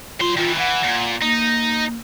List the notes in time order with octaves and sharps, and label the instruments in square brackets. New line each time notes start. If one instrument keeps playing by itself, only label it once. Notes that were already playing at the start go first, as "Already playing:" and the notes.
[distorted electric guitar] F#3 C6 [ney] F4
[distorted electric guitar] D#3 E3 [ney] F4
[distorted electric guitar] E3 [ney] F#5
[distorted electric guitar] A#2
[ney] A#3 [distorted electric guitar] D#4